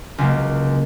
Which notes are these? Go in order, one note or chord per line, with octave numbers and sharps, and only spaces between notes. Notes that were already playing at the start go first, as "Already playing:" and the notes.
C#2 C#3 F#3 A#3